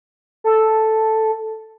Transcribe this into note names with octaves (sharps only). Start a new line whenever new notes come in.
A4